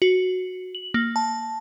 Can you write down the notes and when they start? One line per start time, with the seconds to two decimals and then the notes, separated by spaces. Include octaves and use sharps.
0.02 F#4
0.75 F#7
0.94 A#3
1.16 A5